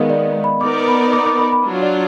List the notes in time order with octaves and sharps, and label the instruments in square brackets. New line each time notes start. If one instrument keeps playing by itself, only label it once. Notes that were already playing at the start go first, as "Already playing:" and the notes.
Already playing: [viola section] D#3 G#3 B3 [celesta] A#4 D#5 F5
[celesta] D5
B5
[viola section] B3 D#4 A#4 D5 [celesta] D6
[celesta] B5
D6
D6
B5
B5
[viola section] F#3 D4 F4
[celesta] D5